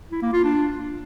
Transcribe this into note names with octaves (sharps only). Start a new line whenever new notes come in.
E4
A#3
F4
D4